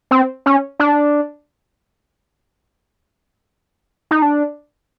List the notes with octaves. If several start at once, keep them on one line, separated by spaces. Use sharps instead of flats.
C4
C#4
D4
D#4
D4